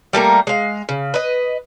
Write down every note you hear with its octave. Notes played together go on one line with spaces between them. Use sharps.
G3 A3 A#3 A#4
G#3 F5
C#3
B4 D#5